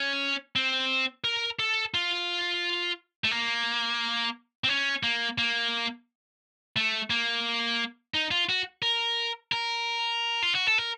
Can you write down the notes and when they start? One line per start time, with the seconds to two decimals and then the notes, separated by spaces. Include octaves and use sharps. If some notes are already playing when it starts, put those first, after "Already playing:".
Already playing: C#4
0.56 C4
1.24 A#4
1.59 A4
1.94 F4
3.24 A3
3.31 A#3
4.64 C4
4.69 C#4
5.03 A#3
5.38 A#3
6.76 A3
7.10 A#3
8.14 D#4
8.31 F4
8.49 F#4
8.83 A#4
9.52 A#4
10.42 F4
10.55 F#4
10.67 A4
10.78 A#4